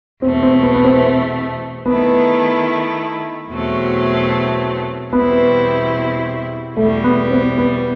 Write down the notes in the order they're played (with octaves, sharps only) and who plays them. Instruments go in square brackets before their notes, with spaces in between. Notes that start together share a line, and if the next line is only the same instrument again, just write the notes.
[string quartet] E2 B2 A3 [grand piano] C4
[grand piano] C4
B3
B3
C4
[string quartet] D#3 A3 E4 [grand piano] B3
[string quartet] E2 B2 F#3 A3 C4
[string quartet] E2 B2 G3 C4 E4 [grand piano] B3
[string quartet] E2 B2 G3 [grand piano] A3
[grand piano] B3
C4
B3